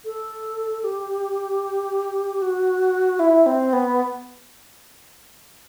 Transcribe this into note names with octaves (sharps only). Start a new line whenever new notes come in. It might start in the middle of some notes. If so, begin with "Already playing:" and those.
A4
G4
F#4
E4
C4
B3